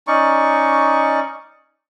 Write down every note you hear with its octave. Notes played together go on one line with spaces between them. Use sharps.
C#4 D#4 D5 C#6